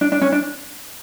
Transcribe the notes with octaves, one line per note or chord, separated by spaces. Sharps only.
D4
D4
C#4
D4